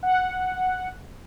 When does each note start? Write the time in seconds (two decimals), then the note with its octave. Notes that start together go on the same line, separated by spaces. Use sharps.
0.03 F#5